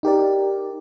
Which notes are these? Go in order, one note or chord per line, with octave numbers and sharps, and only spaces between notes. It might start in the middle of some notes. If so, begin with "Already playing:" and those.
D#4 G4 A#4 D5